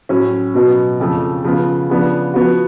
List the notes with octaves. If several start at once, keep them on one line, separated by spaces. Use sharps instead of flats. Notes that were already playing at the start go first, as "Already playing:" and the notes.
A2 F#3 C#4
B2 F#3 B3
F2 C#3 F3 A3
C#3 F3 B3 F4
C#3 F3 B3 D4
F3 B3 F#4